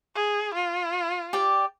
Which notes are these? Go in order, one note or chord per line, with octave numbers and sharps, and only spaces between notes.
G#4
F4
G4 D5 G5